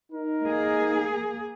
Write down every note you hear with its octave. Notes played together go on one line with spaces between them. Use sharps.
D#4 A#4
A#3 G#4